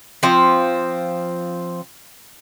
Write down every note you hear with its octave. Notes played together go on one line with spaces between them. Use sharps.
F3 C4